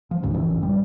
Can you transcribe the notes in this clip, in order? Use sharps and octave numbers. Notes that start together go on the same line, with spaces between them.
F3
F#1 D2 G#2 C#3
A1 F#2 E3
G3